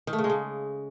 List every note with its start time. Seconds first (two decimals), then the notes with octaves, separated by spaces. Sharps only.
0.07 D#3
0.13 A3
0.18 C#3
0.24 G#3
0.30 C#3